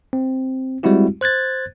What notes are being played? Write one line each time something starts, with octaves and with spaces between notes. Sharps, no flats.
C4
G3 G#3 C4 E4 F#4 G4
C5 F#6 G#6 A6